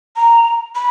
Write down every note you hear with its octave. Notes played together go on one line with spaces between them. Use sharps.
A#5
B5